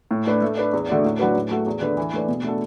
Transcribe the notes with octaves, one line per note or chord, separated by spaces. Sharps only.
A2
A3 D4 B4
A3
D4 B4
E2
D3 A3 F#4 D5
A2
F#3 D4 F#4 B4
A2
A3 F#4 A4
E2
D3 A3 D4 B4
E3
A3 D4 B4 D5
B2
A3 D4 F#4 A4